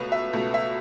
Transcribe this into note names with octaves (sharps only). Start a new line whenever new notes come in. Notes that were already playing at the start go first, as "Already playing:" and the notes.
Already playing: C#2 B2 A3 B4
E5
C#2 B2 A3
E5